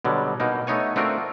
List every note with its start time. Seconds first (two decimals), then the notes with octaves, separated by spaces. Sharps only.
0.05 B2 D3 F#3 G3
0.40 B2 A#3 D#4
0.67 A3 B3 D#4 C#5 G#5
0.96 A3 C4 D4 F4 F#4 A#4